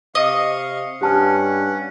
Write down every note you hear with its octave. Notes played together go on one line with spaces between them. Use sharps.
C3 D#5 F5 C#6
G2 C#4 G4 F#5 A5 F6